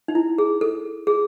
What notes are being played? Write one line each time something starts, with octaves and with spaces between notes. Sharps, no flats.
D#4
E4
G#4
A4
G#4